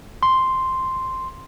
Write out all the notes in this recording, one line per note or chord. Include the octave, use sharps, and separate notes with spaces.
C6